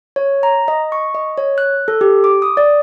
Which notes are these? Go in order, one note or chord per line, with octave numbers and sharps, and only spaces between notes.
C#5
A#5
D#5
C#6
D#5
C#5
F#6
A4
G4
D6
D#6
D5